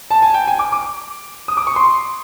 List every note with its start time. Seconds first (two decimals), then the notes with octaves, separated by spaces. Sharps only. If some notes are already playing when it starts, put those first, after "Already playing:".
0.11 A5
0.22 G#5
0.34 G5
0.48 G#5
0.59 D6
0.72 D6
1.48 D#6
1.57 D6
1.67 C#6
1.76 C6